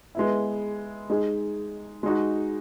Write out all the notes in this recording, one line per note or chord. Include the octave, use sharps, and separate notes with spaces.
G#3 B3 E4
G#3 D#4 G#4
G#3 D#4 F#4